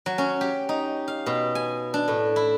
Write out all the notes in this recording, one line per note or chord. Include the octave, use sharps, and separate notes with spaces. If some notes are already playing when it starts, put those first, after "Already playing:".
F#3
C#4
G4
D#4
F5
B2
G#5
D4
A2
E4